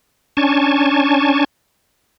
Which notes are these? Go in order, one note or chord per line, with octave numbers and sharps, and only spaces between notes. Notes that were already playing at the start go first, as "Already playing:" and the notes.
C#4 D4 G#5 A5 C#6